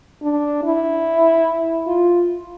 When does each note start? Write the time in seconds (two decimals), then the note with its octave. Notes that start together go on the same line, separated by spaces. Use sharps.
0.23 D4
0.64 E4
1.87 F4